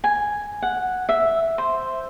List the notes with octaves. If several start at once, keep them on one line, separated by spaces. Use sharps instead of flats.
G#5
F#5
E5
C5